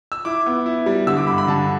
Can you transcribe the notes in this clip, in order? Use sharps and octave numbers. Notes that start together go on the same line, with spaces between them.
E6
E4 D6
B3
E4
G3
D3 E6
D6
G2 B5
B5
D3 A5